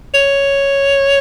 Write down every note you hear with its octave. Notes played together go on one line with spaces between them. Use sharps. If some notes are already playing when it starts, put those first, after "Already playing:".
C#5